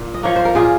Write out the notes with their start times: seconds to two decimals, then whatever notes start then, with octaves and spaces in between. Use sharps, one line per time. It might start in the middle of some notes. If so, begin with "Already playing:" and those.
Already playing: A#2
0.14 D#5
0.23 F3 A#3 C#5
0.36 C5
0.45 A#4
0.55 A#2 F4 G#4